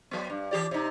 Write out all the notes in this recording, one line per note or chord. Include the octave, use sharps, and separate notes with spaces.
F#3 B3
G2
E3 G4 D5
C3 D#4